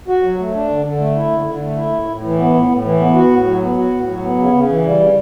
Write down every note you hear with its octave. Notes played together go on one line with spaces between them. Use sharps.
F#4
F#3
A3
D4
D3
D3
A3
E4
D3
D3
A3
E4
A2
A2
E3
B3
A2
A2
E3
B3
F#4
A2
F#3
B3
F#4
A2
F#3
B3
C#3
C#3
E3
G3
C#3